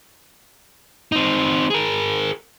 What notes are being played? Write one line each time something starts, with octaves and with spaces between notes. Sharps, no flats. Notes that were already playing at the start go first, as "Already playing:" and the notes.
C4 D#4
G#4 A#4